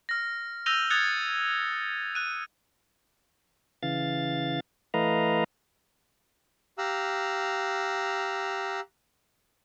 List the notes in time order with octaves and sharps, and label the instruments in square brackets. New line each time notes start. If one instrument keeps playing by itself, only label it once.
[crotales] F6 A#6
E6 G6 A#6 D#7 F7 G7
D#6 F#6 G#6 A6 C#7 F7
F#6 D#7
[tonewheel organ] C#3 E3 F5 A6
E3 A3 B4 D#5 F5 A#5
[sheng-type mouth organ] G4 F5 A#5 E6 F#6